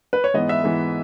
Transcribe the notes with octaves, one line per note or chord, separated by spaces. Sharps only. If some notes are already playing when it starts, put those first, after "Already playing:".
B4
C#5
G#2 E3 B3 D#5
E5
G#2 E3 B3